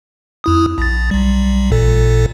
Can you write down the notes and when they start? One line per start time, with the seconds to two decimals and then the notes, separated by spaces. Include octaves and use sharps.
0.44 F2 E4 D#6
0.78 A#1 A6
1.11 B1 G3
1.72 A1 A#2 A4